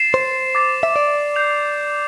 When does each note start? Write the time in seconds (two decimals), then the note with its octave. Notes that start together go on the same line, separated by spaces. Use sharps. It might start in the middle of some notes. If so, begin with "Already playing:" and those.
Already playing: A6 C7 E7
0.14 C5
0.55 D6 A6 C7
0.83 E5
0.96 D5
1.36 G6 C7 F7